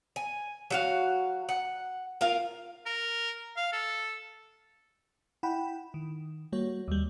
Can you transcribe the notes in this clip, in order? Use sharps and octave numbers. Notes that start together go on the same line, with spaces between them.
G#5
F#3 F#4 F5
F#5
F4 A#4 F5
A#4
F5
A4
E4 F#5 G5 B5
D#3
G3 A#3 F#4 C#5
D#2 G3